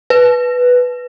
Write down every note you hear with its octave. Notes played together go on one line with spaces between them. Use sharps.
B4